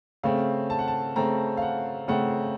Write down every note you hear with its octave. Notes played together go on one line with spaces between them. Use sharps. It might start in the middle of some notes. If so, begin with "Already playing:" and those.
C#3 A3 C4 F5
A5
F#5
A5
C#3 A3 C4 A#5
F5
F#5
C#3 A3 C4 F#5